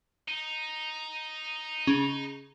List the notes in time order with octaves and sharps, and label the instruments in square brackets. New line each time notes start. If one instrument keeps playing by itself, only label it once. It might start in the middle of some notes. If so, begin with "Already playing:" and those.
[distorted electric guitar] D#4
[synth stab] C#3